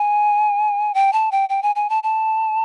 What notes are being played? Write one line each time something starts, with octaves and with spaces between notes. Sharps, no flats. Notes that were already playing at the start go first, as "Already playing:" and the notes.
Already playing: G#5
G5
A5
G5
G5
G#5
G#5
A5
A5